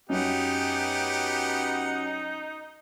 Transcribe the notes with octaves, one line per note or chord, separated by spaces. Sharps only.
F#2 B3 D#4 G4 F#5